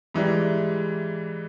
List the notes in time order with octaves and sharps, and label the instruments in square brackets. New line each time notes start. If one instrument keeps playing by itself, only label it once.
[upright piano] G#2 E3 G3